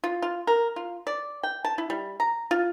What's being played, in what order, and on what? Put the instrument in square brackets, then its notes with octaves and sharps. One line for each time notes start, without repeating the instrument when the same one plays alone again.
[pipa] F4
F4
A#4
F4
D5
G5
A5
E4
G3
A#5
F4